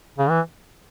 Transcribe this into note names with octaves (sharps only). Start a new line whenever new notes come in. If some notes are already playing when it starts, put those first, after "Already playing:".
C#3
E3